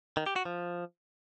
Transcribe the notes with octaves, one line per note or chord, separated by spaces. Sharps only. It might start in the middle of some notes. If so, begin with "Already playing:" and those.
D#3
G4
F#4
F3